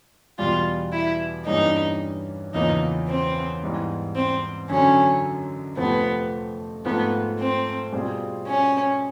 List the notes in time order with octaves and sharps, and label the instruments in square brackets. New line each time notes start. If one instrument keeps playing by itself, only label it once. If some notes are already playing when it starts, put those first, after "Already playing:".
[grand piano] E2 B2 G3 [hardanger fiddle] F4
[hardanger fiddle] E4
[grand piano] G2 E3 G3 A#3 C#4 [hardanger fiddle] D#4
[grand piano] E2 C#3 F3 A#3 C#4 [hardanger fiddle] D#4
[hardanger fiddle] C4
[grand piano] G#2 E3 G3 B3
[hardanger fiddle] C4
[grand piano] F#2 D3 F#3 [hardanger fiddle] C#4
[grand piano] F2 C3 F3 A3 C4 [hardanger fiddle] B3
[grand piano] G#2 F3 A3 C4 [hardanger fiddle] B3
[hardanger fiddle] C4
[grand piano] B2 G3 C4 F4 G#4
[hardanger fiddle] C#4